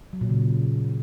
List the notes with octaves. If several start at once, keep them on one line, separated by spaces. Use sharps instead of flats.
F#3
A#2
C#3